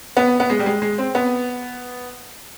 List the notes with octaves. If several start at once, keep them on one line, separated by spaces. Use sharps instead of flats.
B3
B3
G#3
G3
G#3
G#3
C4
B3